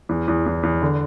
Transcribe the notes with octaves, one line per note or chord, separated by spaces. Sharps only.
E2
E2
E2
E2
D3